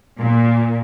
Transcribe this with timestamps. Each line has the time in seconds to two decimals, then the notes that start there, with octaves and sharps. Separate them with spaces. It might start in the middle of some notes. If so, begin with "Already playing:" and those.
0.18 A#2